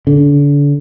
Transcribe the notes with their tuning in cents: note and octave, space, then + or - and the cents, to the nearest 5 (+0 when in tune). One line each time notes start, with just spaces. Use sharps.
D3 -35